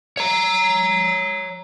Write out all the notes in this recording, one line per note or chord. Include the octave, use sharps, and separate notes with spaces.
C#5 A#5